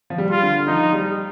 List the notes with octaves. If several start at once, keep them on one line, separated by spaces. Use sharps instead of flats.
F3
G3
F4
D3
F3 D#4
G3